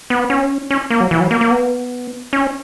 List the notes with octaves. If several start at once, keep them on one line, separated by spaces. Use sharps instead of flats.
B3
C#4
C#4
A#3
F#3
E3
F#3
A#3
A#3
B3
C#4